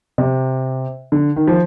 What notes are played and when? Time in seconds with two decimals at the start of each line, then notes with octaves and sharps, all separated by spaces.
0.18 C3
1.12 D3
1.36 D#3
1.47 F3